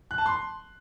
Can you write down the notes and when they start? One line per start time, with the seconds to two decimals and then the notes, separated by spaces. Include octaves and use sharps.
0.11 F#6
0.18 A5
0.26 C6